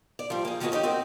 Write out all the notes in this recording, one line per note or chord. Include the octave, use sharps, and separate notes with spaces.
D5
F3 G3
A#3 G#4
D#3 F3 A#3 B3 F#4 G#4
C#4 D#4 F#4 G4
C4 D#4 F#4 A#4